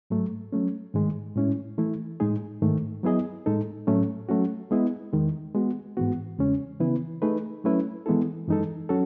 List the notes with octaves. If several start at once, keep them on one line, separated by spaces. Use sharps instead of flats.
G#2 F#3 A3
F#3 A3 C#4
G#2 D#3 G#3
A2 G#3 C#4 E4
E3 A3 E4
A2 G#3 D#4 G#4
G#2 D#3 A3
F#3 B3 E4 G#4 D#5
A2 G#3 D#4 A4
A2 F#3 A3 C#4
F#3 A3 C#4 F#4
G#3 B3 E4 G#4 D#5
E2 D#3 G#3
G#3 B3 F#4
G#2 E3 G#3 B3 F#4
E2 C#3 G#3 C#4
C#3 E3 B3 E4 B4
A3 D#4 G#4 B4
F#3 A3 C#4 E4 B4
E3 G#3 B3 E4 A4
F#2 E3 G#3 D#4 A4
F#3 C#4 F#4 A4